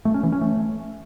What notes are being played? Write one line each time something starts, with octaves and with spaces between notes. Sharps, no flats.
A3
C#4
E3
C#4
A3